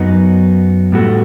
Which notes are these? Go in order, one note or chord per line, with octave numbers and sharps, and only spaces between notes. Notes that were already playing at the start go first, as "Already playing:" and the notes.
Already playing: F#2 F#3 B3 D#4
A2 G3 B3 F#4 A4